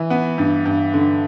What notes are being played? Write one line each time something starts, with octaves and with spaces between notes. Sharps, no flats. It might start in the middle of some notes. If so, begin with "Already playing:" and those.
Already playing: E3
B3
G2
G2
D3